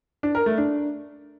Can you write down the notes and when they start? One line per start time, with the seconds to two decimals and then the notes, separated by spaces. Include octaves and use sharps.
0.23 D4
0.35 A#4
0.46 A3
0.58 D4